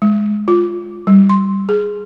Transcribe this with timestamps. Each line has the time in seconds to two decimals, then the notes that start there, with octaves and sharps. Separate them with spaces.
0.02 G#3
0.48 F4
1.07 G3
1.29 C6
1.69 G#4